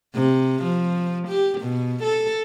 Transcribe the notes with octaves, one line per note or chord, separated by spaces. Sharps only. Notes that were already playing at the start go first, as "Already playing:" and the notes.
C3
F3
G4
B2
A4